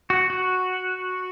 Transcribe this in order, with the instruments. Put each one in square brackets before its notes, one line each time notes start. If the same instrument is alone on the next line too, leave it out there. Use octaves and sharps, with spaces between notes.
[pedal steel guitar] F#4
F#4